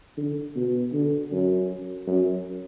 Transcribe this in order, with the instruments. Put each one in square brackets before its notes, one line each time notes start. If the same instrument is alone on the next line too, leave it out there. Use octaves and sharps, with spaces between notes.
[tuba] D3
B2
D3
F#2
F#2